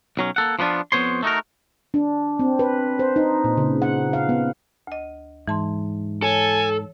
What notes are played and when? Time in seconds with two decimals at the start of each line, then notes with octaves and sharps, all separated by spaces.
0.17 B1 F#3 C#4
0.36 A#3 A4 F#5
0.59 F3 A#3 B3 D4 F4
0.92 F2 B3 C5 C#5 C6
1.23 A3 D#4 F#4 A#4
1.94 D4
2.39 C4
2.59 B4
2.99 C5
3.16 D#4
3.44 A#2
3.57 C#3
3.82 F#5
4.13 F5
4.29 B3
4.87 D2 D#5
5.47 G#2 E3 A5 C6
6.22 A4 C#5 G#5